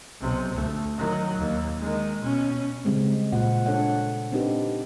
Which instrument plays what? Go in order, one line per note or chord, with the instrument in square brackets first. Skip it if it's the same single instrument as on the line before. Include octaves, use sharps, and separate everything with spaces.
[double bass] B1 C3
D2 A3
D#3 F#3
D#2
D#3 G#3
B2 C#4
[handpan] C#3 G3 G#3 C4
A#2 C5 F#5
D4 A4 C#5 F#5
C4 D4 D#4 G4 B4